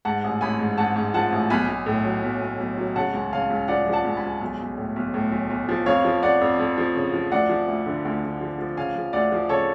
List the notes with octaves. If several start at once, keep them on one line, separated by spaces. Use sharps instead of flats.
G#2 F#5 A5
A1
A1 G#5 B5
G#2
G#2 F#5 A5
G#2
F3 F#5 A5
A1
B1 G#5 B5
B1
A2
F#3
B1
B1
B1
F#3
C#3 F#5 A5
C#2
C#3 F5 G#5
C#2
F3 D5 F#5
F3
F#5 A5
C#2
G#5 B5
C#2
B1
B1
A2
B1
A2
B1
B1
F3
F2 C#5 F5
F3
F2 D5 F#5
F2
F2
F3
C#3
F3
D2 D5 F#5
F3
D2
D3
D2
D3
F3
F3
C#3 F5 G#5
F3
D2 D5 F#5
F3
C#3 A4 C#5